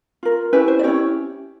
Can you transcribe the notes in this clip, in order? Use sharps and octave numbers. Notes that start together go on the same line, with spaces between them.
F4 A#4
C#4 E4 G4 B4
C5
D5
C#4 E4 G4 C#5